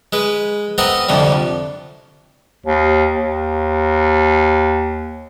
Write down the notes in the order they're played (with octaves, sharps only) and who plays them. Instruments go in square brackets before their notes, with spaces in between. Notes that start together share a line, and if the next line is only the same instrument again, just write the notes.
[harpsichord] G#3 B4
B3 C4 A#4 D#5 F#5
C2 F2 D3 F3 G3
[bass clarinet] D#2
D#2